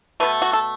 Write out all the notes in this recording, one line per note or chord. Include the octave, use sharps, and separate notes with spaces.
B2 A3 B4
F#4
A4